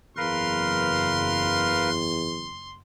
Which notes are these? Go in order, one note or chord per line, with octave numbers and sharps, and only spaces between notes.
F#1 E2 A#4 B4 F5 C6